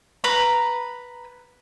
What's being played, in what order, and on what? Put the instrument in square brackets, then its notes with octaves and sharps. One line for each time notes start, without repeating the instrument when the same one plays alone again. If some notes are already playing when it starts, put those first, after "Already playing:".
[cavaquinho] B4 A#5 B5